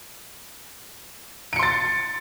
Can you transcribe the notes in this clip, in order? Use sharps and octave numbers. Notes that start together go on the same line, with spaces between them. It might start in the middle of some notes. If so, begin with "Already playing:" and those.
C6 A6 C#7 D7